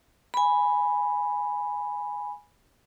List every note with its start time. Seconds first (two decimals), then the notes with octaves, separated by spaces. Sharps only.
0.34 G#5 B5